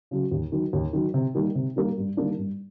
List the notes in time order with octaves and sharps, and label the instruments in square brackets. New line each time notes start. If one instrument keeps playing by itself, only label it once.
[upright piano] C#3 F#3
D#2
D#3 F#3
D#2
D#3 F#3
C3
D#3 G3 A#3
C3
D#3 G3 A#3
G2
D#3 G3 A#3 D4
G2